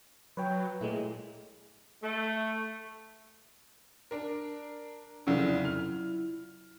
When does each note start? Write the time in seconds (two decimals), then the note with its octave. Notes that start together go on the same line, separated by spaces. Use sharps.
0.37 F#3 B4 C#5 G5
0.81 A#2 G#3 A3 E4
2.02 A3
4.11 D4 A#4
5.27 F1 C#3 F#3 E4 F4
5.65 F6